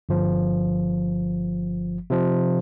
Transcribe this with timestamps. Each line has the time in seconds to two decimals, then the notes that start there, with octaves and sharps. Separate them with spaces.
0.09 G1 F3
2.10 C3 F3